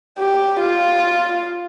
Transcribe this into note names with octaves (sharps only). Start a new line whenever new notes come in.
G4
F4